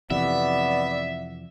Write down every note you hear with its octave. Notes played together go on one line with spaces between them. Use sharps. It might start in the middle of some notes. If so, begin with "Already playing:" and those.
F2 C3 E3 B3 D5 E5